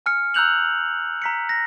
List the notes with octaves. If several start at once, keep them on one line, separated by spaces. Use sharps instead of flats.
G#5 F6 C#7
A#5 E6 F#6 G6 F7 F#7
A#5 B6 C#7
A#6